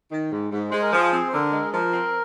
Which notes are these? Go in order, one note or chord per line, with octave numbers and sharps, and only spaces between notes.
D#3
G#2
G#2
G#3 C5
A#4
F3 G#4
C4
C5
D3 A#4
G#3
F3 A#4
C4